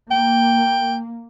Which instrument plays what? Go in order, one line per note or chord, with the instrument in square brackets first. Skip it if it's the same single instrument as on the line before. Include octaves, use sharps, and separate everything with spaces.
[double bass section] A#3 [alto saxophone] G5